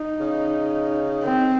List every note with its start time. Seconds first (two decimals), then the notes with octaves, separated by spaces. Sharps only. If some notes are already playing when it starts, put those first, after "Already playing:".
Already playing: D#4
0.20 C#3
1.24 D#3 C4